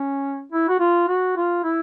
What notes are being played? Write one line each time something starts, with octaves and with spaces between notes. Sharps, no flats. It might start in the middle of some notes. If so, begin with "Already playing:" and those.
Already playing: C#4
E4
F#4
F4
F#4
F4
E4